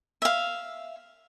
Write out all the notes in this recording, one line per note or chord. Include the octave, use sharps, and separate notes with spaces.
E5 F5